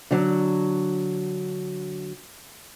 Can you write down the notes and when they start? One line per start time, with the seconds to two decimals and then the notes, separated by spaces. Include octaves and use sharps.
0.11 D3 F#3